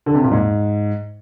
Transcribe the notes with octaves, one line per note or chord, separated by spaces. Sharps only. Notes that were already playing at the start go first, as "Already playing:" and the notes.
D3
C3
A#2
G#2